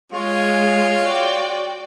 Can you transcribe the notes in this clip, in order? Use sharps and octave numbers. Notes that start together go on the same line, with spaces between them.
G#3 F4 C#5
F#4 D5 G5